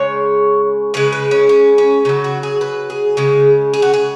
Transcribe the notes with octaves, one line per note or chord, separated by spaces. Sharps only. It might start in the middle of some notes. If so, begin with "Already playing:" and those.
Already playing: C#3 G#3 C#5
C#3 G#3 B4
B4
C#4
C#4
C#4
C#3 F#3 D#4
F#4
G#4
B4
G#4
C#3 G#3
G#4
F#4
G#4